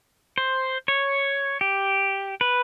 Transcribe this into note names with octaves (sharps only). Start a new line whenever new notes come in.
C5
C#5
G4
B4